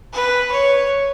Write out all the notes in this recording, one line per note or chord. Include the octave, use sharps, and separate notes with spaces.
B4
C#5